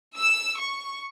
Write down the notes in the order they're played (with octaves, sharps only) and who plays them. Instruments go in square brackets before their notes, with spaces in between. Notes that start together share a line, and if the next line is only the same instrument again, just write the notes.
[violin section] E6
C#6